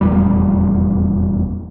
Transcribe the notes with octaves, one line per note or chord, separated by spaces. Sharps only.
F1 E2 A#2 G3